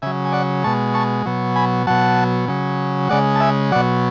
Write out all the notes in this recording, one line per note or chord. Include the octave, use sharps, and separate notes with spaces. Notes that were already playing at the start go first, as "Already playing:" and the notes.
C#3 F#3 E5 G#5
G#5
D5 F#5
B2 G#3 A5 C#6
A5 C#6
B2 F#3
G#5 B5
B2 F#3 F#5 A5
C#3 F#3
C#3 G#3 D5 F#5
A5
E5 G#5
B2 F#3 D5 F#5